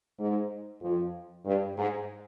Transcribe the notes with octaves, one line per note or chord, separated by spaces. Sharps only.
G#2
F2
G2
G#2